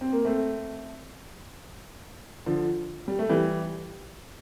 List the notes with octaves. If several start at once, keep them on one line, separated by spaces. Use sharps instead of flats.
C4
A#3
A3 C4
D3 F3
G3
A3
E3 G3